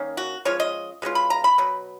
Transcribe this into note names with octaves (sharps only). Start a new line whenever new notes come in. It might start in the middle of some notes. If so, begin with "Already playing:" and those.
Already playing: D#3 A#3 C#4
F#4
F3 G#3 C#4 F4 C#5
D#5
B2 G#3 C#4 F4
B5
A#5
B5
B2 F#3 B3